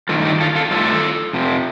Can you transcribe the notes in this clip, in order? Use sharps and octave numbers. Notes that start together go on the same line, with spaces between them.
G2 D#3 A3 F4 A4
D#4 G4
F4 A4
F4 A4
G2 D#3 A3 F4 A4
F2 C3 F3